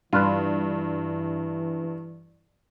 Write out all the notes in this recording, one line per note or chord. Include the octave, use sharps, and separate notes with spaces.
G2 E3 F4 B4